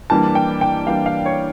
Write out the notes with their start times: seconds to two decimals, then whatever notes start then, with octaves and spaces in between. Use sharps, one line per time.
0.10 E3 G3 A#3 D4 A5
0.35 G5
0.61 G5
0.87 E3 G3 A#3 D4 F5
1.06 F5
1.26 C#5